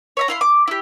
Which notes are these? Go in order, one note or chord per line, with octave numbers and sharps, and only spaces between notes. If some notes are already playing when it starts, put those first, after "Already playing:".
C#5 E5 A#5
E4 F5 C6
D6
E4 G4